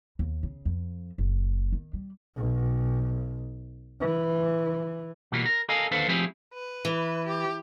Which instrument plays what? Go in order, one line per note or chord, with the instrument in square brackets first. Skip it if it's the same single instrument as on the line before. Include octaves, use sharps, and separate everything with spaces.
[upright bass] D#2
C#3
F2
F#1
D#3
G3
[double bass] B1
E3
[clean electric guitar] B2 E3 G3 A#3 F4
A#4
A4 A#4 D#5 F5 G#5 A#5
D#2 D3 A4 B4 C5 F5
F3 A3 C4 E4 G4 G#4
[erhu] B4
[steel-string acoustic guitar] E3
[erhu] G4